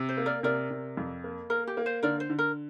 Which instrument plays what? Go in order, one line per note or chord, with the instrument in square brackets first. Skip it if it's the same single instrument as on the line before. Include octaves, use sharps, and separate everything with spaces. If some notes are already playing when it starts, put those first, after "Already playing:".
Already playing: [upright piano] C3
[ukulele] C5
[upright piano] A#3
[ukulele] A#4 D5
[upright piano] C3 [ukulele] A#4 D5
[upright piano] C3
F2
A#3
[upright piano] A#3 [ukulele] A#4
[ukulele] G4
[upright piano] A#3
[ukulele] C5
[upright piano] D3 [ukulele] A#4 D5
[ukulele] C5
[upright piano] D3
[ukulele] A#4